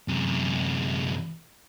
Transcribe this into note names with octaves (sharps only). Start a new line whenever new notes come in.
F#2 C3